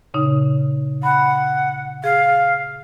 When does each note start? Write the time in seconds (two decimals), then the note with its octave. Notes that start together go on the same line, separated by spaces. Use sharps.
0.14 A#2 C#3 D#4
1.03 F#5 B5
2.04 G#4 F5